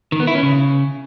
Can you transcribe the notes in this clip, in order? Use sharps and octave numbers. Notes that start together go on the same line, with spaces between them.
D#3
B3
E4
C#4
C#3